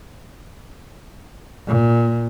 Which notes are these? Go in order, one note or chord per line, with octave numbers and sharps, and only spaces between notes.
A#2